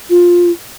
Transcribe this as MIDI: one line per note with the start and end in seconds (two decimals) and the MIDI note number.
0.10 0.51 65